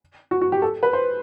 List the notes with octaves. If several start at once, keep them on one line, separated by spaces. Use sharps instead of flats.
F#4
F#4
G4
A4
B4
C5